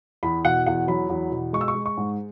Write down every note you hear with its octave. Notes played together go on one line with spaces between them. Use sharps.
E2 B5
B2 F#5
E2 F#5
F#3 B5
E2
B2
G#3 C#6
E6
C#6
G#3
C#6
G#2